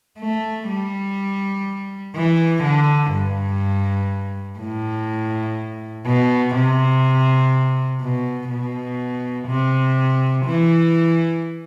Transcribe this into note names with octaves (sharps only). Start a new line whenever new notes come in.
A3
G3
E3
D3
G2
A2
B2
C3
B2
B2
C3
E3